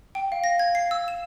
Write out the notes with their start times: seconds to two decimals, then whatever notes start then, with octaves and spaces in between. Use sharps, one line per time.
0.15 G5
0.32 F5
0.44 A#6
0.59 G#6
0.75 C7
0.91 E6
1.08 E7